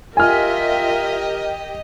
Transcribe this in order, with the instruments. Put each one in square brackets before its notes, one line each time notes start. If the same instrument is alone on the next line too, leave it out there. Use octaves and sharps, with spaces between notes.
[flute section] F4 E5 [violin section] G4 D#5 [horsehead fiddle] A#4 [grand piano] G#5 F6